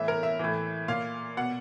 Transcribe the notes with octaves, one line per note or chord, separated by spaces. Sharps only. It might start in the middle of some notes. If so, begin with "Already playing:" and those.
Already playing: A2 E3 E5
A#4
E5
A2 E3
A#2 F5
B2 F#5